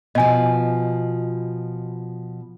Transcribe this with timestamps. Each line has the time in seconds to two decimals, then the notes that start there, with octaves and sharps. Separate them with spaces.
0.15 B2 F3 D#5 G#5